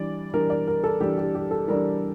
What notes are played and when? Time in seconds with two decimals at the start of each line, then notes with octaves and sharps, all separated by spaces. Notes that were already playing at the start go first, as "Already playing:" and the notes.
Already playing: E3 G3 D4 D5
0.34 E3 G3 D4 A#4
0.50 D5
0.67 A#4
0.84 A4
1.00 E3 G3 D4 G4
1.17 G4
1.35 G4
1.51 A4
1.68 E3 G3 D4 A#4